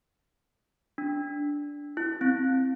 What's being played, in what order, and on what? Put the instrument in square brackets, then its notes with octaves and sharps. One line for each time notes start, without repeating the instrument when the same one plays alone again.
[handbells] D4
E4
C4